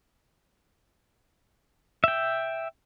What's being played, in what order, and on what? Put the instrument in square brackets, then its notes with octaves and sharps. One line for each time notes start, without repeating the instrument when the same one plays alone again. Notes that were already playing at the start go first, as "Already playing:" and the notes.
[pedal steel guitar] E5 G5